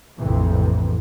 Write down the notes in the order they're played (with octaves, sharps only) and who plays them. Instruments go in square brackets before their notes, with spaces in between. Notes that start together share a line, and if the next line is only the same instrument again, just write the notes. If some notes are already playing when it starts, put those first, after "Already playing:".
[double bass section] F1 A#1 F2 A2 C3 E3